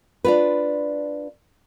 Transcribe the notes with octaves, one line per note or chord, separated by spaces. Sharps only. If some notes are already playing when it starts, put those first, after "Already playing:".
D4 F4 B4